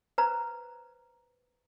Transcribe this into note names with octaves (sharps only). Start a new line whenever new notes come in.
B4 C5 A#5